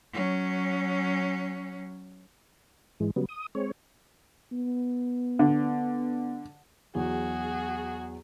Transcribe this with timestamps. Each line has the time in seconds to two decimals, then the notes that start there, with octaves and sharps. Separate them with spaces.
0.13 F#3 C#4
3.00 G#2 E3 G#3
3.16 C#3 F#3 G3 B3
3.29 D#6
3.55 G#3 C4 C#5
4.52 B3
5.39 D3
6.95 E2 F#3 F#4 G#4